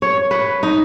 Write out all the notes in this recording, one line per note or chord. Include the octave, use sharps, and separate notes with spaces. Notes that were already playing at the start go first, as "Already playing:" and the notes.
C#5
B4
D#4